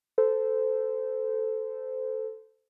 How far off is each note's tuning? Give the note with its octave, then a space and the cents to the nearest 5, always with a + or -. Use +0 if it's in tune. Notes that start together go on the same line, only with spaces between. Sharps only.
A4 +0 C5 -20